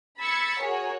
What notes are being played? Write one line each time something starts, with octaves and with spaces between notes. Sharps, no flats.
B5 E6 G#6 A6 B6 C#7
F#4 G#4 A#4 C#5